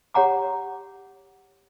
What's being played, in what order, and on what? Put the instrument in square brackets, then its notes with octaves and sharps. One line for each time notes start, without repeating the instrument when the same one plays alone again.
[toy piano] G4 C#5 F#5 A#5 D6